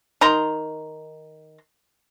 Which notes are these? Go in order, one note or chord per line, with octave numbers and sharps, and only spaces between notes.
D#3 A#5 C6